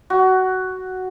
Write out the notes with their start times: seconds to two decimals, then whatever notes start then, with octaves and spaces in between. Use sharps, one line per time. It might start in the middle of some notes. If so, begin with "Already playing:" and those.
0.10 F#4